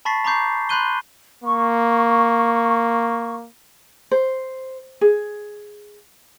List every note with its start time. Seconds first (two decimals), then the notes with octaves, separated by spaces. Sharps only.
0.05 A5 B5 C#6 A6 B6 C7
0.25 A#5 B5 C#6 D6 G6 C7
0.69 B5 C6 F#6 G6 D#7 G7
1.44 A#3 C#6
4.11 C5
5.01 G#4